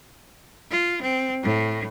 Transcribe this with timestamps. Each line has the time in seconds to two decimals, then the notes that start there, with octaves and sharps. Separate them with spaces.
0.70 F4
1.02 C4
1.43 A2